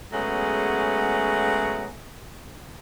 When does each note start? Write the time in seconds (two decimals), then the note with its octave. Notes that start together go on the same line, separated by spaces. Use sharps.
0.13 F#3 G#3 A3 B3 C#4 G#4